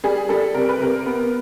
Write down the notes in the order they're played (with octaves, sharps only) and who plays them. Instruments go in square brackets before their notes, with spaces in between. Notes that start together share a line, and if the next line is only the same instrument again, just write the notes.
[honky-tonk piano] G3 G#4
G3 A4
C3 A#4
B4
C3 A#4
B3